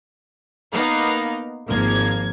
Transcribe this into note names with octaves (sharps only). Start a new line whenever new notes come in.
A#3 B3 D#4 F5
G#1 F3 A#3 G#6